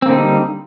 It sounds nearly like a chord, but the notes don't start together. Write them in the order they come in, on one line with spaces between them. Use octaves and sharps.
C4 A#3 D3 D#4 G3